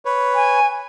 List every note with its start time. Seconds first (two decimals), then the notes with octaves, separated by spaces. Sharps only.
0.05 B4 C#5
0.35 G#5